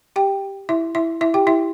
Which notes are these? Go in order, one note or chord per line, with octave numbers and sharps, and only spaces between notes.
G4 G5
E4 E5
E4 E5
E4 E5
G4 G5
E4 E5